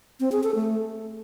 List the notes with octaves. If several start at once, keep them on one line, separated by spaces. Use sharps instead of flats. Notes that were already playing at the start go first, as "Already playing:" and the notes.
C4
G#4
A4
A3